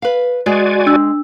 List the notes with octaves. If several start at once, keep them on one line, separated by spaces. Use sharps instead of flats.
B4 F5
G#3 F#4 D5 G#5
D4 E6